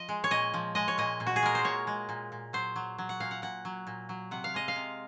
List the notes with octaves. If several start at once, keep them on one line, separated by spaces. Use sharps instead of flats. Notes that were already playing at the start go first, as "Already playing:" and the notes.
Already playing: F3 D#5
G#3
C#5
A#2 D#5
F3
G#3 D#5
C#5
A#2 D#5
A#2
F#4
G#4
G#3 A#4
C5
A#2 C#5
G#3
A#2
A#2
F#3 C5
F#3
F#3
F#5
A#2 F5
F#5
A#2 F#5
F#3
A#2
F#3
C3 F#5
F5
G#3 D#5
F5
C3